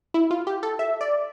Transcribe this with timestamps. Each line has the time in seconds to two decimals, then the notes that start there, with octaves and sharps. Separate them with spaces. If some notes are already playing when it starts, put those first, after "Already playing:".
0.14 E4
0.31 F4
0.47 G4
0.63 A4
0.79 E5
1.01 D5